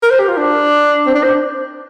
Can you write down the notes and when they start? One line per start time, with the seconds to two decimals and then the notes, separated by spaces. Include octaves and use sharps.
0.03 A#4
0.10 C5
0.20 G4
0.28 F4
0.37 D4
1.07 C4
1.15 D4
1.24 C5